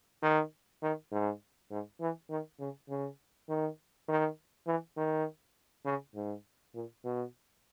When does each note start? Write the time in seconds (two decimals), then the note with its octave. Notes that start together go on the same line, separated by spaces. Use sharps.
0.23 D#3
0.82 D#3
1.12 G#2
1.71 G#2
2.01 E3
2.30 D#3
2.60 C#3
2.89 C#3
3.49 D#3
4.08 D#3
4.67 E3
4.97 D#3
5.85 C#3
6.15 G#2
6.75 A#2
7.05 B2